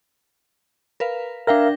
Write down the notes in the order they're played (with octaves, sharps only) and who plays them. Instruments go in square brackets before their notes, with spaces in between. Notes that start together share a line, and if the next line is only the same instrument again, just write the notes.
[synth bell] A#4 B4 F5
[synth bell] D4 G5 A#6 [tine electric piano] A#4 E5 F5